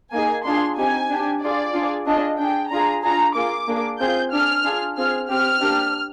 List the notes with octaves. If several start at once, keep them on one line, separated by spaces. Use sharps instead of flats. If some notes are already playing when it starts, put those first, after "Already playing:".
A#3 D#4 G#4 G#5
D4 F4 G#4 C6
C4 D#4 G4 G#5
D4 G4
D4 F4 G#4 D5
D4 F4 G#4
D4 F4 G#4 D#5
D4 G#4 G5
D4 F4 G#4 A#5
D4 F4 G#4 A#5
A#3 F4 G#4 D6
A#3 D4 G#4
C4 F4 G#4 G6
D4 G#4 F6
D4 F4 G#4
C4 F4 G#4 F6
C4 G4 F6
A#3 D4 G4